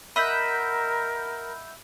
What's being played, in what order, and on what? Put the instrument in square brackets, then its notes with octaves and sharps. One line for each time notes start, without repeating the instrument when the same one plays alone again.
[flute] A#4 [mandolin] D#5 E5 F#5 [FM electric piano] B5 G6